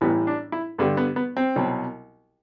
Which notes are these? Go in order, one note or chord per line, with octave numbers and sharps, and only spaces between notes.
A1 A2 E3 G3 B3
D4
E4
G2 D3 G3 B3
B3
B3
C4
C2 B2 F#3